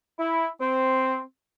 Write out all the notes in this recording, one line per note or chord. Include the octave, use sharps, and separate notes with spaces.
E4
C4